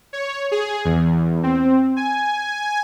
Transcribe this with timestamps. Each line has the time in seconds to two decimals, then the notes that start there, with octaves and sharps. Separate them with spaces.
0.13 C#5
0.52 G#4
0.85 E2
1.43 C4
1.96 G#5